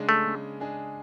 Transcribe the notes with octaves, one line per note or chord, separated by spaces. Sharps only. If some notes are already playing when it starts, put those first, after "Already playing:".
Already playing: C#3 G#3 D4 G#4
A3
C#3
G#3 D4 G#4